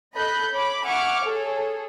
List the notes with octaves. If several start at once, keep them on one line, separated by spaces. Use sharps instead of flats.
A4 D#5 B5 F#6 G6
C#5 B5 D6
E5 F#5 G#5 C#6 D6 F6
G#4 A4 C#5